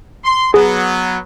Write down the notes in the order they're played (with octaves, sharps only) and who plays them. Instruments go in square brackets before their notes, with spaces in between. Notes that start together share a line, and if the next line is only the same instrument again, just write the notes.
[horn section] C6
[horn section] F#3 B3 [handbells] G#4